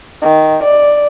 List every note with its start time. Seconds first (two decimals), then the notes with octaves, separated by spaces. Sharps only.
0.22 D#3
0.63 D5